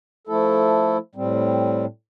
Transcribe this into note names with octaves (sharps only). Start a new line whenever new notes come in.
F3 A3 E4 A4
A2 G3 C4